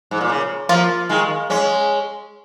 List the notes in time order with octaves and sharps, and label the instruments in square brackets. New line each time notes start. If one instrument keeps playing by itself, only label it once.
[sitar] G#2
A#2
C#3
[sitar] F3 A#3 [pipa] F4
[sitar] D#3 G#3
G#3 C#4